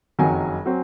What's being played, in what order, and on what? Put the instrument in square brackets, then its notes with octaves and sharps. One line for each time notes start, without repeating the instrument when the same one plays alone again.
[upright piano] F#1 F2 D#3 F#3 G#5
F#3 C4